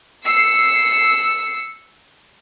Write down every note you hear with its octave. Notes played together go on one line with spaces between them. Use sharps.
E6 C7 C#7